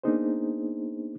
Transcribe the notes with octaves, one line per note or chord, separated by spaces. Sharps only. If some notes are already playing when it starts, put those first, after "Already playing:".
A#3 B3 D4 D#4 G#4 C5